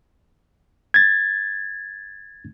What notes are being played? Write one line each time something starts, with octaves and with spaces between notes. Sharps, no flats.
G#6 A6